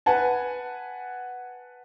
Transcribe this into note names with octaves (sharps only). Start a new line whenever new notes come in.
B4 F#5 G#5 A5